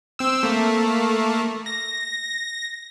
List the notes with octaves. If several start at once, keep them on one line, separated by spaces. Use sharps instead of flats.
C4 E6
A3 A#3
A#6